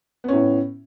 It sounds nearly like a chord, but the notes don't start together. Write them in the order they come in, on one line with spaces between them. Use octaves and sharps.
B3 C#4 A2